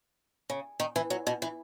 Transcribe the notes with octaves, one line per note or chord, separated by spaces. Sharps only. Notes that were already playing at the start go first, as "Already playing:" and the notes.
C#3
D#3
E3
F#3
B2
E3